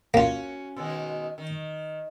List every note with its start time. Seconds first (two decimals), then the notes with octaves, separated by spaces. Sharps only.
0.14 A#3 C#4 F4 F#4
0.76 B2 D#3 G#3
1.38 D#3